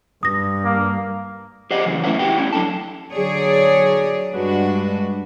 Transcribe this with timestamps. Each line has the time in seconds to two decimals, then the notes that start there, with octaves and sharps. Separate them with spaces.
0.23 G2 D#6 A#6
0.65 A#3
1.71 G4 G#4 C5 D5 D#5 F#5
1.86 A2 C#3 E3 F#3
2.03 A3 C#4 E4 B4 E5 F#5
2.19 E4 F#4 G4 F#5 G5
2.38 G3 C#4 E4
2.53 F#3 D4 A4 A5
3.12 D3 F#3 G#4 C#5 D5
4.32 G2 G#3 D4 F#4 B4